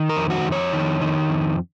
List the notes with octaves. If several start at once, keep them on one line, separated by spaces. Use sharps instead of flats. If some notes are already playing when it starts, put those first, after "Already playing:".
Already playing: D#3
A#4
F2
F#4
F2
C#5
D#3
D#3
F2